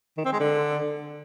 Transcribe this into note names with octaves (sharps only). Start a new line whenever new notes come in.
D#3
C4
G#3
D3